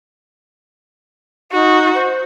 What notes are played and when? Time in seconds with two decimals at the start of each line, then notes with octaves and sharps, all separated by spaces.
1.52 D#4 F#4
1.94 C5